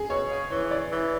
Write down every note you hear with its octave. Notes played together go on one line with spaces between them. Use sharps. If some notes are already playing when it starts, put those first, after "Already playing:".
Already playing: G#4
B2 C#5
C#3
E3 C#5
D5
E3 C#5